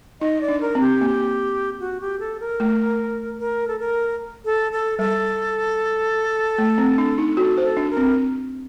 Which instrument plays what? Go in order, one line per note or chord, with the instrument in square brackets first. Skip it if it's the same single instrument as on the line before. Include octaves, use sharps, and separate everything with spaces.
[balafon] D#4 [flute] D#5
[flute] D5
[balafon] D4
[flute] A#4
[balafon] C4
[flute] G4
[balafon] A#3
[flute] F#4
G4
A4
A#4
[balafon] A3
[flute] A#4
A4
A#4
A4
A4
[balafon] G3 [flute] A4
[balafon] A3
C4
D4
D#4
[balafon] F#4 [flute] A4
[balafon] C5
[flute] A4
[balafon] D4
[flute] A#4
[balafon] C4